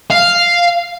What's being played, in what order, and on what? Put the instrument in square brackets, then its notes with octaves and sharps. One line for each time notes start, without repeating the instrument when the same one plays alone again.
[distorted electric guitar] F5